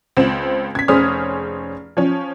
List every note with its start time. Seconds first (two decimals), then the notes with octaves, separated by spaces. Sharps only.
0.17 C#2 C4 E7
0.75 G#6 B6
0.88 F1 C#4 G#4 C5 D#6 F6
1.97 F3 C#4